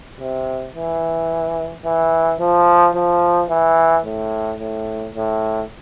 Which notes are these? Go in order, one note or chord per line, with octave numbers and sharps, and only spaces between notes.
C3
E3
E3
F3
F3
E3
A2
A2
A2